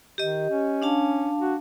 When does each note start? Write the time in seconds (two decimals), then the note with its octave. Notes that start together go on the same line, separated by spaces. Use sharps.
0.18 D#3 G4 D#5
0.50 C#4
0.82 D4 F5 A5
1.40 F#4